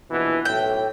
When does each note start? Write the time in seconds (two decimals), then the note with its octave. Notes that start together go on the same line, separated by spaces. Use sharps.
0.11 A#1 B2 E3
0.45 B1 A2 G5